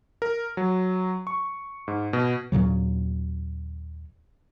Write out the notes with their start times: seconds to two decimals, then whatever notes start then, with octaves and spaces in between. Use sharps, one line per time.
0.22 A#4
0.57 F#3
1.27 C#6
1.88 G#2
2.13 B2
2.52 D#2 A#2 C#3 F#3